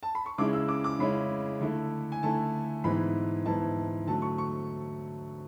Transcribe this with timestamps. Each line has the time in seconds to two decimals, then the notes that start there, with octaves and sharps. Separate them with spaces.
0.03 A5
0.15 B5
0.26 C#6
0.38 C#3 G#3 C#4 E4 D6
0.53 E6
0.68 D6
0.84 D6
0.99 C#3 G#3 C#4 E4 B5
1.61 D3 A3 E4
2.12 G#5
2.23 D3 A3 E4 A5
2.84 G#2 E3 B3 E4 B5
3.45 G#2 E3 B3 E4 A5
4.06 D3 F#3 A3 A5
4.22 C#6
4.38 C#6